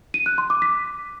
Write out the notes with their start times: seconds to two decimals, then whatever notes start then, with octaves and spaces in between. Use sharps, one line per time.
0.14 D#7
0.26 F#6
0.38 C6
0.50 D6
0.62 B6